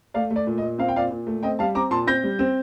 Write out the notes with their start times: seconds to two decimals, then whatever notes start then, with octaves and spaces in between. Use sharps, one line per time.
0.14 A3 D5 F5
0.31 A3
0.36 D5
0.47 A#2
0.58 D#5
0.62 A#2
0.78 C4 F5
0.88 G5
0.96 A#2 D5 F5
1.11 A#2
1.27 A3
1.43 C4 D#5 G5
1.59 G3 F5 A5
1.75 C4 A#5 D6
1.91 A#2 A5 C6
2.07 C4 G6 A#6
2.24 G3
2.39 C4